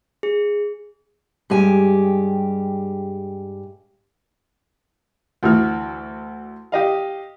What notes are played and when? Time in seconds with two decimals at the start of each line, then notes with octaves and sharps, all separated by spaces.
0.23 G#4
1.50 G2 G#3 G4 G#5
5.43 D2 E3 F#4 F6
6.72 G4 D#5 F5